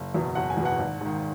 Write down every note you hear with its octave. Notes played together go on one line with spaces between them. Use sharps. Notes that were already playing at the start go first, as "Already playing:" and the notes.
Already playing: F#1
E2 B2
F#1 F#5
G#5
E2 B2
F#5
G#1
G#2 D#3